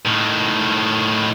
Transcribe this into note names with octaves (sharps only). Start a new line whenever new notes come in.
A2 D#3